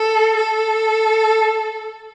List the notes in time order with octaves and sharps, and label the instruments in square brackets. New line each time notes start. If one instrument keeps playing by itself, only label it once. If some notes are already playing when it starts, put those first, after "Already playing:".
Already playing: [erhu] A4
A4